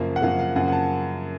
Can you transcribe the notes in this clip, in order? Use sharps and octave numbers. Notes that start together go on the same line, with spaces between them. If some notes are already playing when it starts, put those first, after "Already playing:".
Already playing: F#2 C#3 F3 A#3 F5
F#5
F#2 C#3 F3 A#3 F5
F5
F#2 C#3 F3 A#3 F#5
F#5
A5